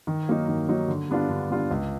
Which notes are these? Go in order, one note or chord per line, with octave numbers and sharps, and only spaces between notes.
D#3
F#3 A#3 D#4
D#3
F#3 A#3 D#4
D3
G3 B3 D4 F4
D3
G3 B3 D4 F4
C#2